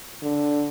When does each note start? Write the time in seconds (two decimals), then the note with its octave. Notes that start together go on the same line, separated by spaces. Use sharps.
0.23 D3